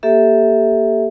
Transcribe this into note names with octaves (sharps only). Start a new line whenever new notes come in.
A#3 G4 A4 E5